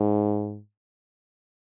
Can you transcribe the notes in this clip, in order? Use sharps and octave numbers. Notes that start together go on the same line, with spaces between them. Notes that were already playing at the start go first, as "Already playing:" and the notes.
Already playing: G#2